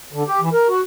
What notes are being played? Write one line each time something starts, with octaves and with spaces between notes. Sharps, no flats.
D3
G4
E3
A#4
F#4